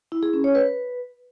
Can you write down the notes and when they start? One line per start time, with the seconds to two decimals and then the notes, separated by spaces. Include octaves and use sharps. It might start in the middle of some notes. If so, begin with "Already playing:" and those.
0.12 E4
0.23 G#4
0.33 C#4
0.44 C#5
0.55 B4